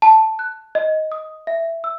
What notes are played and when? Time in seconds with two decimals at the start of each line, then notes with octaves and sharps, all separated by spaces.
0.02 A5
0.39 F#6
0.75 D#5
1.12 D#6
1.47 E5
1.84 E6